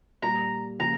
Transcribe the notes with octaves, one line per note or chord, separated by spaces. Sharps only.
A#2 G3 A#3 A#5
C#3 F3 A#3 A#5